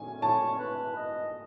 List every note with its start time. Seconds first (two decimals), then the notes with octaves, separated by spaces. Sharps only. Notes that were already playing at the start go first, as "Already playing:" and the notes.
Already playing: G#5
0.22 C#5 A5
0.59 B4
0.97 D#5